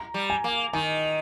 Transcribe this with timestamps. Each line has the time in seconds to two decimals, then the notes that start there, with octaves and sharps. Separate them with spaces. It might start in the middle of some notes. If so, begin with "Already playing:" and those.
Already playing: A#5
0.14 G3
0.30 G#5
0.44 A#3
0.73 D#3 G#5